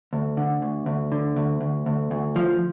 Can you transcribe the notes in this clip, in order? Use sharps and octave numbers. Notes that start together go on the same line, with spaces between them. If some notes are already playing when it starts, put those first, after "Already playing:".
D2
D3
D2
D2
D3
D2
D2
D2
D2
F3